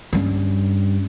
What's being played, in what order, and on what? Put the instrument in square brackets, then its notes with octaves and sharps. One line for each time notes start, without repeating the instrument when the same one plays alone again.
[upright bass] G2 C#4